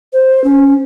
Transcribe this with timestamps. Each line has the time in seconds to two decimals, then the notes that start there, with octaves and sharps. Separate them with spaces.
0.13 C5
0.44 C#4